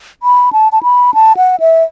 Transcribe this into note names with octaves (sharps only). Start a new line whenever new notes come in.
B5
A5
A5
B5
A5
F#5
E5